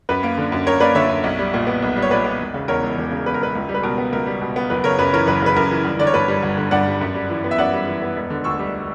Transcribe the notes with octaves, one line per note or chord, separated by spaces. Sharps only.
F#2 B4
A#3
D3
F#2
F#2 A#4 C#5
A#3 B4 D5
D3 C#5 E5
F#2
B1
G3
A#2
B3
B1
G3
C#5
A#2 B4 D5
B3
E1
C#3
E2 A#4 C#5
E1
E1
C#3
E2 B4
A#4
E1 B4
C#2
G3
B4
B2 A#4
B3
C#2 A#4
G3
B2
B3
F#1 B4
C#3 A#4 C#5
F#2 B4
E3 A#4 C#5
F#1 B4
C#3 B4
F#2 A#4
E3
G1
D3 D5
C#5
G2 B4
G3
G1
D3
G2 D5 F#5
G3
F#2
G3
E3
B3
E5
F#2 D5 F#5
G3
E3
B3
E1
D3
D2 C#6 E6
G3